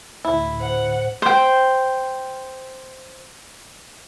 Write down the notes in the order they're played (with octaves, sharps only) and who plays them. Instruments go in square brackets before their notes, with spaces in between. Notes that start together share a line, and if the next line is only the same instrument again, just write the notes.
[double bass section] D2 A2 [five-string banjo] E4
[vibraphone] C5 [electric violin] F#5
[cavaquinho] C5 G5